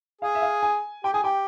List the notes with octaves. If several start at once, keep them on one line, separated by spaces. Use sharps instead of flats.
G#4 F5
E5
F5
G#5
G4 G5
G#4 G#5
G4 G5